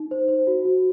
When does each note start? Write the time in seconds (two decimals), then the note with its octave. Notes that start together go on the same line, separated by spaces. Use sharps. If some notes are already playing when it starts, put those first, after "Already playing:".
Already playing: D#4
0.11 C5
0.28 C5
0.47 F#4
0.65 F#4